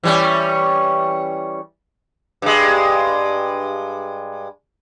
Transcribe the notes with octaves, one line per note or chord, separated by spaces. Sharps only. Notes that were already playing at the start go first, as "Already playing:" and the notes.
E3 G3 C#4
G2 G#3